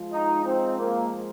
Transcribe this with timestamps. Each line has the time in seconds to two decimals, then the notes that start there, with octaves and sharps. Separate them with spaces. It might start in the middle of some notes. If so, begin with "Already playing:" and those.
Already playing: F3 G#3 F4
0.13 D#4
0.46 C4
0.79 A#3